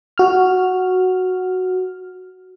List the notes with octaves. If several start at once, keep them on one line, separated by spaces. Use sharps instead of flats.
F#4 F6